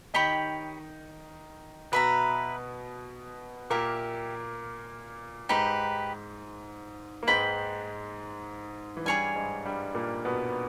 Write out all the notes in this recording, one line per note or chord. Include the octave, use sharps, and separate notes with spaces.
D#3 D#4 G4 C#5 G5 B5
B2 B3 B4 E5 A#5
A#2 A#3 G4 A#4 E5
G#2 G#3 D#4 G4 B4
A#3
G#2 G#3 B4 G5 B5
E3
G2 G3 G#4 C#5 G#5
G#2 G#3
G2 G3
A#2 A#3
B2 B3